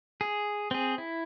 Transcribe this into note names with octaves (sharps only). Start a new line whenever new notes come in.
G#4
C4 G#4
E4